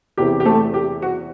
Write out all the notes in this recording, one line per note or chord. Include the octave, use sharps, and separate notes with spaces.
E2 C3 E3 G4
G4
A3 A4
G4
F#4